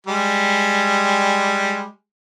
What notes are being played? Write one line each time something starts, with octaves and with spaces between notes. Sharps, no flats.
G3 G#3